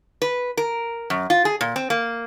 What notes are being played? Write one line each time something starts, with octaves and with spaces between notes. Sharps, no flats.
B4
A#4
F#2
F4
G#4
A#2
C4
A#3